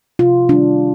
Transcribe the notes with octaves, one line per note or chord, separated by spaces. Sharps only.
C3 F4
D#3 G3 D4